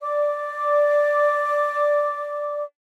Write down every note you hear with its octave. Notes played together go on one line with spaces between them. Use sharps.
D5 D6